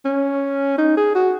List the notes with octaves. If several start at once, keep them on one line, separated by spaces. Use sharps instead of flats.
C#4
D#4
G#4
F#4